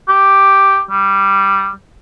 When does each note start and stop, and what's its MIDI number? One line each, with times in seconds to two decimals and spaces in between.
0.08 0.81 67
0.90 1.71 55